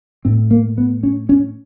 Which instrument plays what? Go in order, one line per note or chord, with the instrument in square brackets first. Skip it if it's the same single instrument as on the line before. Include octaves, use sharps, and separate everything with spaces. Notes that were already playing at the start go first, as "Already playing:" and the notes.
[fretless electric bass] A2 C4
A#3
B3
C#4
C#4